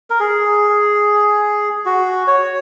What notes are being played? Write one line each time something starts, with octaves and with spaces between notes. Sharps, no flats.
A#4
G#4
F#4
C#5